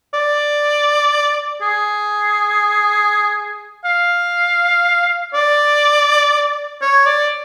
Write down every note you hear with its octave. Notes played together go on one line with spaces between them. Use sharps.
D5
G#4
F5
D5
C#5
D5